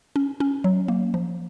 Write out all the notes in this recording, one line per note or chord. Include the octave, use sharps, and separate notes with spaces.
C#4
C#4
F#3
A#3
F3